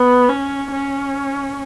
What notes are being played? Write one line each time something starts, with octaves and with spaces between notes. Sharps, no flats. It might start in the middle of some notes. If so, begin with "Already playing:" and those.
Already playing: B3
C#4
C#4